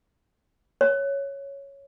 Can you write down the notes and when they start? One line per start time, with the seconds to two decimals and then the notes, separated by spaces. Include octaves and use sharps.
0.81 C#5